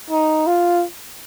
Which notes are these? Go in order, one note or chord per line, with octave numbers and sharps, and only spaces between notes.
D#4
F4